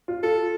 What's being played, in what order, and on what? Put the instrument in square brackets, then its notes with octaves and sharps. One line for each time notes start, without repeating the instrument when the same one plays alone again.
[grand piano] F4
[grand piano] F4 [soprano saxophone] A4